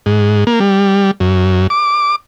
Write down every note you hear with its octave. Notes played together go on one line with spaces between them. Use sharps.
G#2
A#3
G3
F#2
D6